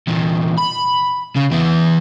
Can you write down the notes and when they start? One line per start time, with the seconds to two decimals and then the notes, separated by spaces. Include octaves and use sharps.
0.08 E2 A#2
0.58 B5
1.36 C#3
1.51 E3 B3